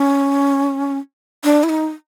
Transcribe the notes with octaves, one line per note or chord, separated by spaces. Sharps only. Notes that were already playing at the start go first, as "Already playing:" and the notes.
Already playing: C#4
D4
E4
D#4